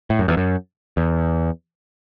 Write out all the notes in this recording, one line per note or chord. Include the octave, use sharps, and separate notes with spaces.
A2
F#2
E2
F#2
E2